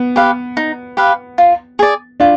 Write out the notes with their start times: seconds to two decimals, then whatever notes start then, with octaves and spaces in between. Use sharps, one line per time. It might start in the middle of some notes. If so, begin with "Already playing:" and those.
Already playing: B3
0.16 G4 B4 F5
0.57 D#4
0.97 G4 B4 F5
1.38 F4
1.79 G#4 D5
2.20 D4 F4